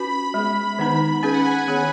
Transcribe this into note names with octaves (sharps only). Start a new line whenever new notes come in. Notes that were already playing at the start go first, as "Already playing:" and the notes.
Already playing: C#4 F#4 B4 B5
B5
G#3 B3 G#4
D#3 B3 D#4 B4
C#4 G#4 B4 G#5
F#5
G#5
D#3 B3 G#4 C#5